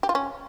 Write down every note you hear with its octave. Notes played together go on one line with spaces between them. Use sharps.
G4
F4
C#4